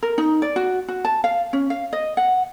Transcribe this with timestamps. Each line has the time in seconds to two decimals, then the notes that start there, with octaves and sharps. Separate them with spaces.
0.03 A#4
0.18 D#4
0.42 D5
0.56 F#4
0.88 F#4
1.05 A5
1.24 F5
1.53 C#4
1.70 F5
1.93 D#5
2.17 F#5